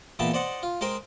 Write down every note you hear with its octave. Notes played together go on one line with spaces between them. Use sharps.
E2 A#2 E3 B3 G5 A5
C5 D5 D#5 F#5
F4
G#3 G#4 A#4 C5 G5